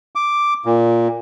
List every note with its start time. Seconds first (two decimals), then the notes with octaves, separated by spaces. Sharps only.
0.15 D6
0.65 A#2